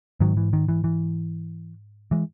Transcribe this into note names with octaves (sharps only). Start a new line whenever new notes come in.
G#2 D#3 F#3
E3
D#3
E3
E3
E3 G#3